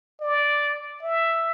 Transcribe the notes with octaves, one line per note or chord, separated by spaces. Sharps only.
D5
E5